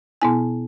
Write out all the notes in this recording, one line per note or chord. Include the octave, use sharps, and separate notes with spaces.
B2 B3 E4 G#5